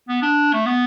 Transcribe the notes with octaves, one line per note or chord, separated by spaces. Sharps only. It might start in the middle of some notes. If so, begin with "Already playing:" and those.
B3
D4
A3
B3